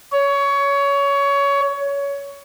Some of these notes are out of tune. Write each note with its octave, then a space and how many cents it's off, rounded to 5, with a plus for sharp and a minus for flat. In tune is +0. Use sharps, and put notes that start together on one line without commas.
C#5 +20